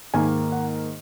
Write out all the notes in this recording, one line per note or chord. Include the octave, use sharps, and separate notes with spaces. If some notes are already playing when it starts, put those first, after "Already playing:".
G#2 D#3 A#3 G#5
F#5